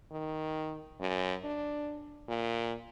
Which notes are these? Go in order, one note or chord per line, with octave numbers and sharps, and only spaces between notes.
D#3
F#2
D4
A#2